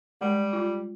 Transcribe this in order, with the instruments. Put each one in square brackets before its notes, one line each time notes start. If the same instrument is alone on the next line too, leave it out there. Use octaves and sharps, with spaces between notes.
[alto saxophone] G3 [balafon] G#3
[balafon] F4